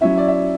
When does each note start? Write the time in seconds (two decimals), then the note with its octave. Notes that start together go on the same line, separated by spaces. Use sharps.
0.01 F#3 C#4 E4 E5
0.18 D5
0.28 E5